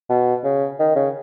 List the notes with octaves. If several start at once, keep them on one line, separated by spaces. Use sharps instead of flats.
B2
C#3
D#3
C#3